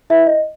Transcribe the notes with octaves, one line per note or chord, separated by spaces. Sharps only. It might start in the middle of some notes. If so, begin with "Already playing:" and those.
E4 B4 E5
D#5